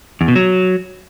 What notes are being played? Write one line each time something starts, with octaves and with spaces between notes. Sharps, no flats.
E2
B2
F#3